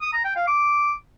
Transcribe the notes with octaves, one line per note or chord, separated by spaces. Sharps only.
D#6
A#5
G5
F5
D6